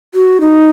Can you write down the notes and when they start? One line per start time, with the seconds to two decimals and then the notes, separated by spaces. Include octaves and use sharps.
0.15 F#4
0.41 D#4